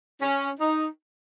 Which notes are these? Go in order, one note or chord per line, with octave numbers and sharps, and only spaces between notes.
C#4
D#4